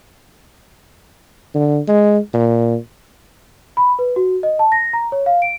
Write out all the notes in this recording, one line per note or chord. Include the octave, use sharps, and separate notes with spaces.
D3
G#3
A#2
B5
B4
F#4
D#5
A5
A#6
A#5
C#5
F5
D7